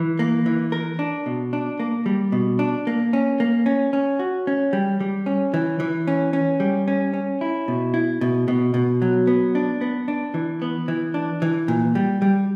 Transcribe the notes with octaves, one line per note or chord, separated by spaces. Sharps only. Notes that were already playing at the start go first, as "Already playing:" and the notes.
Already playing: E3
A#3
E3
A#4
D4
B2
D4
A#3
G3
B2
D4
A#3
C#4
A#3
C#4
C#4
F#4
C#4
G3
G3
C#4
E3
E3
C#4
C#4
G3
C#4
C#4
E4
B2
E4
B2
B2
B2
F#3
B3
D4
B3
D4
E3
B3
E3
D4
E3
A#2
G3
G3